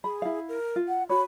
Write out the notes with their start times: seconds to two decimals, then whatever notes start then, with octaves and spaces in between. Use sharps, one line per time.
0.04 G#4 B5
0.22 E4 F5
0.49 A#4
0.76 F4
0.88 F#5
1.09 F#4 C#5 B5